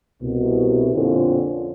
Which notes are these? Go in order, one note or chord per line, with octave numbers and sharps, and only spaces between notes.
C2 B2
F2 A#2 D3 C4 C#4 F4